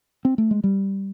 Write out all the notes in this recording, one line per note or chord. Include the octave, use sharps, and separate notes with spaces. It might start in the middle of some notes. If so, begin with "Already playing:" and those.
C4
A3
G#3
G3